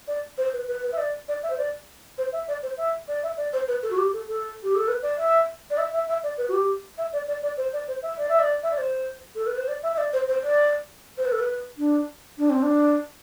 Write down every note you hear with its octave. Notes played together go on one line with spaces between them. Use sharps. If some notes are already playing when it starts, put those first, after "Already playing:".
D5
C5
B4
B4
B4
E5
D5
D5
E5
C5
D5
C5
E5
D5
C5
E5
D5
E5
D5
C5
B4
A4
F#4
G4
A4
A4
G4
A4
B4
D5
E5
D5
E5
E5
E5
D5
B4
F#4
G4
E5
D5
D5
D5
C5
D5
C5
E5
D5
E5
D5
E5
D5
C5
A4
B4
C5
D5
E5
E5
D5
C5
C5
D5
C5
B4
A4
B4
D4
D4
C4
D4